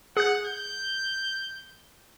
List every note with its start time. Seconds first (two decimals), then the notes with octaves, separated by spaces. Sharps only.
0.17 G#4 F#5 F#6
0.47 G6